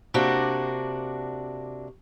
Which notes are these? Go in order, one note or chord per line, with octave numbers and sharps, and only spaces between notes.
C3 A#3 D4 F#4